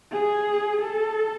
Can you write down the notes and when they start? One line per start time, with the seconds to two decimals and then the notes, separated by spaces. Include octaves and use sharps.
0.12 G#4
0.81 A4